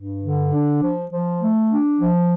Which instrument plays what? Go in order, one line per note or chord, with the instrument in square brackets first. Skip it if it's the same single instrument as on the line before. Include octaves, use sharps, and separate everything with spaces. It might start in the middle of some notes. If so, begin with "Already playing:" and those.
Already playing: [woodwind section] G2
D3
D4
F3
F3
A3
D4
F3